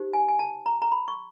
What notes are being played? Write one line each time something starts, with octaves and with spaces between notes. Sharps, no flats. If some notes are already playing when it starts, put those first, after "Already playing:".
Already playing: D#4 G4 C5
G#5
G#5
A5
A#5
A#5
B5
C#6